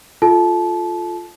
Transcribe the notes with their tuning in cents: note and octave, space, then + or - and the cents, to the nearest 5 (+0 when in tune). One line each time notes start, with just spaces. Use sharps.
F4 +0 A4 -15 A5 -25